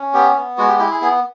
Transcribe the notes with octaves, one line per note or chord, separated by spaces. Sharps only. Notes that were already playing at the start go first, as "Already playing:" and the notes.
Already playing: C#4
B3 G4
B3
G#3 F#4
G4
E4 G4
G#4
B3 G#4